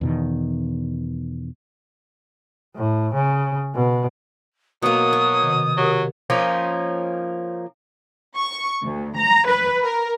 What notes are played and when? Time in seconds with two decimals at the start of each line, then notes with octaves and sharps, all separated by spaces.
0.01 E2 B2 D#3
2.76 A2
3.14 C#3
3.75 B2
4.82 B2 F#3 A#3 D#6
5.13 C#5
5.42 C3 D#3
5.77 F#3 G4 A#4
6.30 F3 A#3 C#4 D#4
8.36 C#6
8.83 D2
9.18 A#5
9.47 B4
9.83 A#4